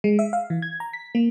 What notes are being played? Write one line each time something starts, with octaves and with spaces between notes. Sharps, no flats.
G#3
E5
F5
E3
G#6
A#5
B6
A#3